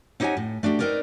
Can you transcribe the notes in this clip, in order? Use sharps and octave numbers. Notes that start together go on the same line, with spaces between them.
C4 D#4 G4 C#5 F#5 G#5
A2
A3 D4 F#4 G4
C4 D#4 A#4 B4 D5